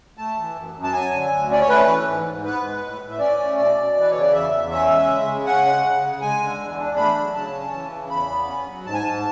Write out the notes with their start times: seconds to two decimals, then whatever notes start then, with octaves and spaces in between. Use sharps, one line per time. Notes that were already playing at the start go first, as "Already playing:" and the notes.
0.17 A3 A5
0.37 E3
0.55 F#2
0.75 F#2
0.84 A5
0.93 F#3 G#5
1.12 D3
1.31 D2
1.50 C#4 D5
1.60 C#5
1.69 A3 B4
1.88 E3
2.06 G#2
2.25 G#2
2.44 B3 B4
2.63 G#3
2.82 A2
3.01 A2
3.10 E5
3.19 C#4 D5
3.38 A3
3.57 B2 D5
3.76 B2
3.95 E3 B4
4.11 C#3 C#5
4.21 D5
4.32 E2 E5
4.52 E2
4.70 C#4 E5
4.90 G#3
5.08 C#3
5.27 C#3
5.46 C#4 F#5
5.65 G#3
5.84 C#3
6.02 C#3
6.21 G#3 G#5
6.40 D3
6.59 E2
6.78 D4
6.96 A3 B5
7.16 F#3
7.34 C#3 A5
7.53 C#4
7.72 E3
7.91 C#3
8.10 E2 B5
8.29 B3
8.47 C#4
8.67 F#3
8.85 G#2 A5
8.94 G#5
9.03 G#2 A5